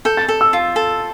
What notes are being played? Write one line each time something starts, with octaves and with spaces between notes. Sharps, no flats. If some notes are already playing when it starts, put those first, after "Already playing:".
A4 G6
A6
A4
E6
F4
A4